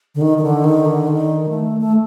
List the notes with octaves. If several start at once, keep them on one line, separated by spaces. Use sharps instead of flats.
D3
D#3
D#3
D3
D#3
D3
D#3
A3
A3